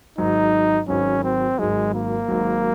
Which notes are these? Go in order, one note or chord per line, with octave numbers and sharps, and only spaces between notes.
G#1 G#2 F#3 D#4
G#1 G#2 F#3 C#4
C4
G#1 G#2 F#3 G#3
A#3
G#1 G#2 F#3